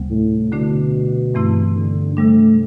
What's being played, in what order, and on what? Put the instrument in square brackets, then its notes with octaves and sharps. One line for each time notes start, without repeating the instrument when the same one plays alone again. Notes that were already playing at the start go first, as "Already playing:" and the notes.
Already playing: [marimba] D2 C3 G3 B3
[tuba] A2
[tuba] B2 [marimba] D3 A3 D4
[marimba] G2 E3 A3 C4 E4
[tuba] D3
[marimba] C3 G3 D4 [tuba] A3